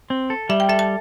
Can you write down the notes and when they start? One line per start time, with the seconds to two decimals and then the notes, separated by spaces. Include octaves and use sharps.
0.10 C4
0.30 A4
0.49 G3 E5
0.60 G5
0.69 A4 E5
0.79 A5